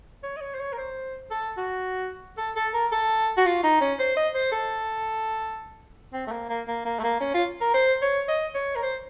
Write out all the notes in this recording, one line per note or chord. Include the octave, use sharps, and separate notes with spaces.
C#5
D#5
C#5
C5
C#5
A#4
C5
A4
F#4
A4
A4
A#4
A4
F#4
F4
D#4
C#4
C5
D#5
C5
A4
C4
A3
A#3
A#3
A#3
A#3
A3
A#3
C#4
F4
A#4
C5
C#5
D#5
C#5
A#4
C5